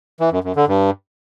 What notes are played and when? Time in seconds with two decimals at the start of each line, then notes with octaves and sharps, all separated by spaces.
0.20 E3
0.32 F#2
0.44 F#2
0.56 D3
0.68 G2